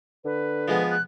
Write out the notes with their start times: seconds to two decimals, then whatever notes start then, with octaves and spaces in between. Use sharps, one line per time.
0.25 D3 B4
0.68 F3 G#3 B3
0.90 F#6